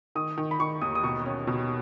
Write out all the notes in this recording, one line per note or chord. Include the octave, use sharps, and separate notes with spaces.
D#3 D#6
D#3
B5
D#3 C#6
D#2 D#6
D#6
B2 C#6
C#4
B2